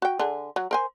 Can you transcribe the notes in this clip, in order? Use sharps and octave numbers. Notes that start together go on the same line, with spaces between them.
F#4 G5
D3 G#4
F#3
A#4 C5 G#5